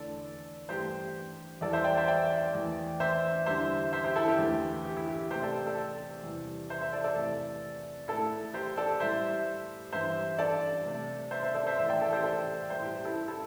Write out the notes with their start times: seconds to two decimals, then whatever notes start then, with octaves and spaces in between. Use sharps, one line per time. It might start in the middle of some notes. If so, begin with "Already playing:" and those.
Already playing: E2 D3 A3 A4 D5
0.69 G2 E3 A3 G4 C5
1.61 E2 E3 G3 A4 D5
1.73 C5 E5
1.84 D5 G5
1.97 C5 E5
2.08 D5 G5
2.54 E2 E3 A3
3.00 C5 E5
3.46 E2 D3 G3 C5 E5
3.92 C5 E5
4.04 G4 C5
4.16 E4 A4
4.28 G4
4.39 E2 D3 A3
4.85 G4
4.97 E4
5.09 G4
5.20 G4
5.31 C3 A3 G4 C5
5.42 A4 D5
5.66 A4 D5
6.23 E2 C3 G3
6.70 C5 E5
6.81 C5 E5
6.93 A4 D5
7.04 A4 D5
7.16 E2 C3 A3
8.08 A2 A3 E4 A4
8.54 G4 C5
8.77 A4 D5
9.00 A2 G3 C5 E5
9.93 G2 E3 G3 C5 E5
10.39 A4 D5
10.86 C3 A3
11.31 C5 E5
11.43 C5 E5
11.55 A4 D5
11.67 C5 E5
11.78 A2 E3 A3 C5 E5
11.89 D5 G5
12.01 A4 D5
12.13 G4 C5
12.23 A4 D5
12.70 A2 G3 C5 E5
12.82 G4
12.93 G4
13.05 E4 A4
13.28 E4 A4